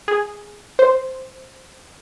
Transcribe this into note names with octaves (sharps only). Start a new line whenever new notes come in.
G#4
C5